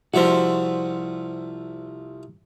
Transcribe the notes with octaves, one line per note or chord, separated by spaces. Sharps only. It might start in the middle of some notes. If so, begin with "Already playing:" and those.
C2 F3 F#4 C5 E5